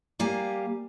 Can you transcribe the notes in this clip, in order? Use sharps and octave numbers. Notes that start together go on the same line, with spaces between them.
G3 A#3 G4 F5 G#5